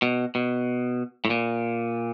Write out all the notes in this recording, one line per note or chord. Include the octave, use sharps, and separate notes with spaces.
B2
B2
A2
A#2